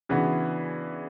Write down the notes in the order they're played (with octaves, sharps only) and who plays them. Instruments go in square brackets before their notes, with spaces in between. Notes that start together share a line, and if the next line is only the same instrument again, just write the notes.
[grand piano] C#3 E3 B3 D4 F#4